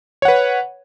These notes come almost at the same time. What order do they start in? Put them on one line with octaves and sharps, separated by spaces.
C#5 F#5 B4